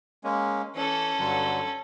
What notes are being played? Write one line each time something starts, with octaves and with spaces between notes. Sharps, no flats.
G#3 A#3 C#4
E3 C#4 A4
G2 D3 F#3